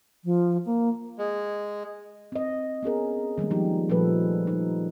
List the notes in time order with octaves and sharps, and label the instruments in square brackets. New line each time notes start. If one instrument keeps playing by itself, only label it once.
[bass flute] F3
A#3
[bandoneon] G#3
[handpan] C4 D#5
B3 C#4 G#4 A#4
D#3 G3 G#3 A#3
F3 G3 D#4 G4
A#2 F3 G3 A3 A4 B4
G3 D#4